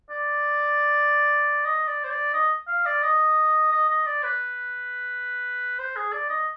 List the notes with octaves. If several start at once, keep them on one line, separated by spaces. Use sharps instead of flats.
D5
D#5
D5
C5
D5
D#5
F5
D5
D#5
D#5
D#5
D5
B4
C5
G#4
D5
D#5